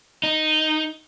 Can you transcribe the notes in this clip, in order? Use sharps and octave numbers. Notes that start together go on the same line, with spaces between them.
D#4